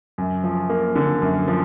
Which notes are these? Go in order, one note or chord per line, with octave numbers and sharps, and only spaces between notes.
F#2
F3
A#3
D3
F#2
F3